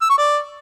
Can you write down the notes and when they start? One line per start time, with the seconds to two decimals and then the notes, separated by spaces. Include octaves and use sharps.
0.02 E6
0.10 C#6
0.18 D5